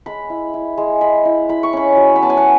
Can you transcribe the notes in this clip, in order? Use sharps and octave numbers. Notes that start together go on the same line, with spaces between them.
G#3 B5
E4
E4
G#3
G#3 B5
E4
E4 B5
C#6
C#4 B5
F#3
B5
B3 A5
G#5
F#5